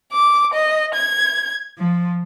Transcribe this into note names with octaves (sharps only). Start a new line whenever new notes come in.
D6
D#5
G#6
F3